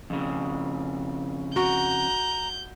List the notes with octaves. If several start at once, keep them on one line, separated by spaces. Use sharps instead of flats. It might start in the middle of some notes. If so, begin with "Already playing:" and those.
F2 C#3
F#4 A#5 G6